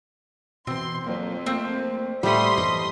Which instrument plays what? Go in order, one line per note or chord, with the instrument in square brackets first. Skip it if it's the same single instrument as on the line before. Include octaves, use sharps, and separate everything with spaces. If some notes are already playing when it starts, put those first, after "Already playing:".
[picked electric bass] B2 E3 [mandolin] C4 [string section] C6
[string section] F2 [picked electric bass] F#3 A#3
[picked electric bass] A3 A#3 [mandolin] C4
[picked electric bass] A2 [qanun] G3 A3 F#5 [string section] C6 D#6 B6
[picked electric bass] F#2 E3 G3 [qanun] D#5